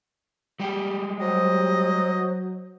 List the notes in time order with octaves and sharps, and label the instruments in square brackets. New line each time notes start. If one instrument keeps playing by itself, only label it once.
[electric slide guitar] G3 G#3 G4
[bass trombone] F#3 [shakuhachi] C5 [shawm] D#5